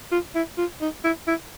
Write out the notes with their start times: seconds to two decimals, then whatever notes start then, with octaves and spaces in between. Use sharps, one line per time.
0.12 F4
0.35 E4
0.58 F4
0.81 D#4
1.04 E4
1.28 E4